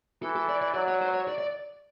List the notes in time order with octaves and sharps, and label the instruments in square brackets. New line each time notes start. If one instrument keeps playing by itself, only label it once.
[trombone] E3 [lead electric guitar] A4
[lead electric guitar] A4
D5
D5
[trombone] F#3 [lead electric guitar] D5
[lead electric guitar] C#5
C5
C#5
D5
D5